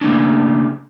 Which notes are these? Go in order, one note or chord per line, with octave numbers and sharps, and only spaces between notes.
C#3 A3 A#3 C#4 D4